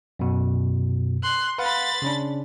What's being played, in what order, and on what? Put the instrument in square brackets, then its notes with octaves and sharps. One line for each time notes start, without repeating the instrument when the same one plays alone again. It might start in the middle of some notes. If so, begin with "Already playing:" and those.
[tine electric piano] F#2 B2
[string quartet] C6 F#6
[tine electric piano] B4 F5 F#5 [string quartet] B5 C6 A6
[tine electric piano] C#3 C#4 D4